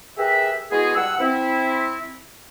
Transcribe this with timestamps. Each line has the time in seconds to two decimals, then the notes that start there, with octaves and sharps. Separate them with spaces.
0.18 G4 G#4 A#4 B4 E5
0.71 G#3 B3 E4 F#4 G#4
0.96 G2 F#5 E6
1.20 C4 E4